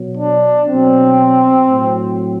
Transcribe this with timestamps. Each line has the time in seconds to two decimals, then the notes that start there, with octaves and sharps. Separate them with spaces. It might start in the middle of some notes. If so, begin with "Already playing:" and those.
Already playing: B2 F#3
0.17 D4
0.67 B2 F#3 C4
1.67 A2 F#3